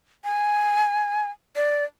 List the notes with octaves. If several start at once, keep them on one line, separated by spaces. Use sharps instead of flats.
G#5
D5